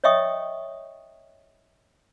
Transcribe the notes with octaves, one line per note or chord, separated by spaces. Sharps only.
C#5 D#5 E5 G5 C#6 D#6